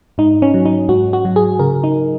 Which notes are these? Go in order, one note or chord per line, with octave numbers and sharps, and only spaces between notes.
G#2 D#4
C#4
F#3
D#4
G#2 F#4
F#4
F#3
G#4
C#3 A#4
D#4